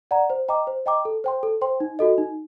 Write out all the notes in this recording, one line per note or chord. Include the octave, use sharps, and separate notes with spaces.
D5 F#5 A#5
C5
D#5 G5 A#5 D6
C5
D#5 G5 A#5 D6
A4
C5 G5 C6
A4
C5 G5 C6
D#4
F#4 A4 D#5
D#4